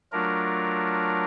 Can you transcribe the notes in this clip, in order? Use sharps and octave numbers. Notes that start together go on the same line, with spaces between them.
F#3 A3 D4 F4 A#4